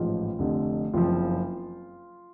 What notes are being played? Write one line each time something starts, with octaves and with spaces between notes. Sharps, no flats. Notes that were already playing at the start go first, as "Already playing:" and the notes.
Already playing: A1 G#2 F3 F4
F1 F2 D3
F#1 F2 F3 F4